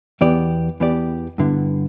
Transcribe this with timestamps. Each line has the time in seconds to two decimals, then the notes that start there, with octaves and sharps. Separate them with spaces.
0.21 E2 E3 B3 G4 D5
0.80 E2 E3 B3 G4 D5
1.38 G2 D3 B3 E4